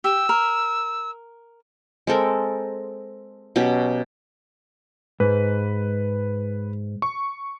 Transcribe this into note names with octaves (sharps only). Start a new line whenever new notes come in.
G4 E6
A#4
G#3 C4 A4 A#4
B2 F#3 C#4 G4
G#2 B4
C#6